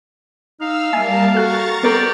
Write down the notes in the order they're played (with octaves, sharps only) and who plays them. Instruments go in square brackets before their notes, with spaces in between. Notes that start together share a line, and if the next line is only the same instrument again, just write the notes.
[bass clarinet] D#4 [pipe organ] F5 [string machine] E6 F6
[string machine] G3 A#4 A5 [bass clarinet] A#3 [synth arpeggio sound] E5 G#5
[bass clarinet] F#4 [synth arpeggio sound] A4 F#6 [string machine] A#5 C#6 A6
[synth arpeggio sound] B3 A4 A#4 [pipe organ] G4 D5